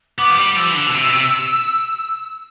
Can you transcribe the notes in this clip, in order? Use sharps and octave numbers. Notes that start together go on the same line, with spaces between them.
B3 D6
F3
G3
F3 E6
E3
D3
B2
C3
B2
C3